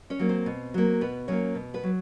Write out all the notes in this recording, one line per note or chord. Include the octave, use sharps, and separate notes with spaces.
C#4 C#5
F#3 A#3
C4 C5
B2
F#3 A#3
B2 B3 B4
F#3 A#3 C#4 C#5
B2
B3 B4
F#3